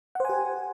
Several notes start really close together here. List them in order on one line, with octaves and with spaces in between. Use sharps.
F#5 C5 G#5 G4